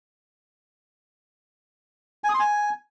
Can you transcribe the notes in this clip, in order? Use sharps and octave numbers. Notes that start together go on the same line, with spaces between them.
G#5
D#6
C6
G#5